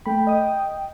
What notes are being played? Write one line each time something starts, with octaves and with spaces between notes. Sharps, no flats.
A3 G5 B5
D#5 D#6